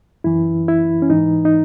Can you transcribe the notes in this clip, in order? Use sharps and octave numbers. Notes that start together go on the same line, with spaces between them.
F#2 E3 E4
E4
C#4
G#2 E3 D#4
D#4